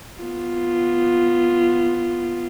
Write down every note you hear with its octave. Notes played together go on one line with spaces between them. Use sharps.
B3 F4